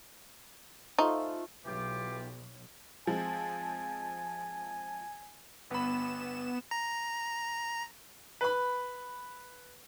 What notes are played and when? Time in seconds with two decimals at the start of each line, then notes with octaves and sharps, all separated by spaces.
0.99 A3 D#4 F4 C5
1.65 B1 E3 F4 G4
3.07 F3 G#3 C4 G#5
5.70 G1 B3 B5 E7
6.71 A#5
8.41 B4 B5